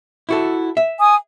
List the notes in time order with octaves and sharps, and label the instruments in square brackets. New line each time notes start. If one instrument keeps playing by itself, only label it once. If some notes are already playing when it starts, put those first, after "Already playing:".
[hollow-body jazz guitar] E4 F#4 A4
E5
[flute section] G#5 D#6